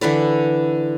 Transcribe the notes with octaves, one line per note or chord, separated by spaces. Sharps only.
D3 E3 B4 D5